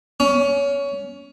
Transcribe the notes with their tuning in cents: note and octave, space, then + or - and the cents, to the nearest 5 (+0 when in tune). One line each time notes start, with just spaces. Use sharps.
C#4 +20